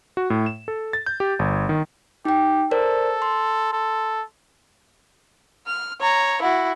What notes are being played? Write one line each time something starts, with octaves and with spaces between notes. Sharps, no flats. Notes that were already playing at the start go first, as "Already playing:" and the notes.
F#4
A2
E7
A4
A6
G6
G4
G1
D#3
D#4 G4 G5
A4 A#4 C5 D5
C6
A4
F6
C#5 A#5
E4 F#4